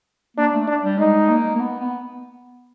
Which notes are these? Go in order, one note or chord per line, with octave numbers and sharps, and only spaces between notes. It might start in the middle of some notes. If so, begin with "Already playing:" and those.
A#3 D4
A3
D4
G3
G#3 D#4
A#3
A#3
B3
B3